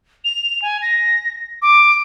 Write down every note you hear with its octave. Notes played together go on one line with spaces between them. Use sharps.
F7
G#5
A#6
D6